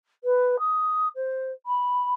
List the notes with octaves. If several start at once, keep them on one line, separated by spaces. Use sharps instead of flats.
B4
D#6
C5
B5